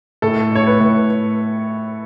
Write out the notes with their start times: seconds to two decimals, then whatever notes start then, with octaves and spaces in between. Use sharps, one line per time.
0.22 A2 A4
0.52 A2 C#5
0.67 B4
0.80 A2